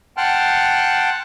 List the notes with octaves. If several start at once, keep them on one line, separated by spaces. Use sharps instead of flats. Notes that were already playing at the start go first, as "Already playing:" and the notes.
F#5 G5 A5 C6 F6 F#6